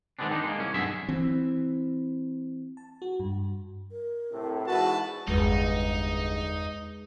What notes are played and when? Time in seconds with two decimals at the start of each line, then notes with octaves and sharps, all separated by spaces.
0.19 D#3 G#3 B3 C4 D4
0.31 D#3 D4 D#4
0.44 G#3 A#3
0.58 C2 C#4
0.74 B1 G2 D3 G#4 E5
1.09 E3 C4
2.77 A5
3.02 F#4
3.20 G2
3.91 A#4
4.31 A2 C3
4.67 E2 G#2 E3 F#4 B4 A5
5.28 G1 E2 G#3 D#4 G#4 B4